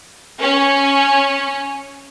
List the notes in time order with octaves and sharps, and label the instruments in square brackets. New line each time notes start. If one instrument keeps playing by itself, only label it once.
[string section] C#4